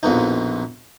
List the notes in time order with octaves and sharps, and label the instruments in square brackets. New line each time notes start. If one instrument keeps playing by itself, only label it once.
[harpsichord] A#1 F2 B2 D#4